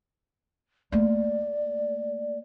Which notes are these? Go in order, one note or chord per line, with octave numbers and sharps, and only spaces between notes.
A3 A#3 D5